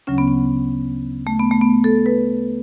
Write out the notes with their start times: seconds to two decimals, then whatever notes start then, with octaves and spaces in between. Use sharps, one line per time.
0.07 D2 C#3 F#3 C#4
0.18 B3
0.28 C#4
1.27 A3
1.39 B3
1.51 A3
1.61 B3
1.84 A4
2.06 B4